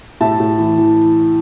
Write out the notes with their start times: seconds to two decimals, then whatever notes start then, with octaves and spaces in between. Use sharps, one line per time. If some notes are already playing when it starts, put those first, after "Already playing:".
0.20 A2 E5 A5
0.40 A2
0.58 E3
0.78 E3